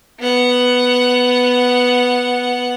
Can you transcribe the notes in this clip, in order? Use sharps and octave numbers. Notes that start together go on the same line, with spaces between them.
B3 F#5